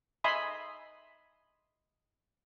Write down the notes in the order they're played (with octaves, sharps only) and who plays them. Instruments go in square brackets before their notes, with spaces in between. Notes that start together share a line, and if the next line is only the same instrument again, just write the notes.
[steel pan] D#5 E5 G#5 B5 C6 D#6